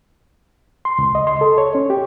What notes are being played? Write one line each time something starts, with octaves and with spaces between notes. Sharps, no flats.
C6
C#2
D#5
C6
A4
C#5
C#4
G4